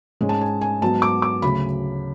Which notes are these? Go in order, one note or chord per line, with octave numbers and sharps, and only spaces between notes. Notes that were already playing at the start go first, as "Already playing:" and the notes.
G#2 G#3 C#4
A5
G#5
G#5
G#2 F#3 B3 A5
D6
D6
D2 C#3 F#3 B5